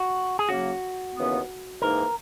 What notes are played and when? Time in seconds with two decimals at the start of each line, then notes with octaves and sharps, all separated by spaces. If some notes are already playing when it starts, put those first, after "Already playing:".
Already playing: F#4
0.39 G#4
0.49 C#3 F#3 A#3 F#4
1.15 D#2 C#3 E3 B3
1.82 G#2 E3 A#3 D#4 A#4